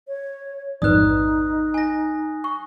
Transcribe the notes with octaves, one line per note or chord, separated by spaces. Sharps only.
C#5
A1 F2 G#2 D#4 B4 D5 D#6 F#6
G#5 A#6
C#6